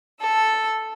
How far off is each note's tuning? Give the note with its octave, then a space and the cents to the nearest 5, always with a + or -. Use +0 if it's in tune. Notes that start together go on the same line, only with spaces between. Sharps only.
A4 +0 E6 +0